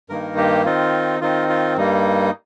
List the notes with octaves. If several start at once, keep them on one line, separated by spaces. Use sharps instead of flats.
G2 D#3 A#3 D#4 A#4
G4
D#3 C4 D#4 F4
D#3 C4 D#4 F4
F4
G2 G3 A#3 D#4